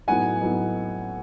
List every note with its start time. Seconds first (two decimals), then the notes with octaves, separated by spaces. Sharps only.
0.07 A2 F#3 B3 D#4 F#5 G#5
0.41 A2 F#3 B3 D#4